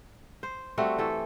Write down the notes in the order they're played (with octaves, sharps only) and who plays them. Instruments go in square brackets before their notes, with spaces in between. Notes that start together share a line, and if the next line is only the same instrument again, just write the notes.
[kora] C5
G3 A3 C4 F#4
E3 A4 G5